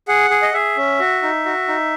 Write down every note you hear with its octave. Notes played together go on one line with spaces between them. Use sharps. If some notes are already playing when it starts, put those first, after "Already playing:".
G#4 F#5
G#4
D#5
G#4 E5
C#4
F#4
D#4
F#4
D#4